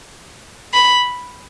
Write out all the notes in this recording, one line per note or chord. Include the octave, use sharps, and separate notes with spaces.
B5